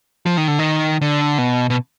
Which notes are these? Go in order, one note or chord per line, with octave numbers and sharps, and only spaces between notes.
F3
D#3
D3
D#3
D3
B2
B2